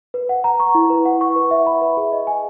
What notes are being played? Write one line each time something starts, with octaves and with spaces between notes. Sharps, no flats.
B4
F#5
A#5
C#6
E4
B4
F#5
C#6
B4
E5
B5
B4
G#4
D#5
G#5